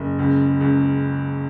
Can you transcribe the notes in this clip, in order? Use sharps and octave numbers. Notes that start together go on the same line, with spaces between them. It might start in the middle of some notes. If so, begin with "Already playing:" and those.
Already playing: F#1
C#2
C#2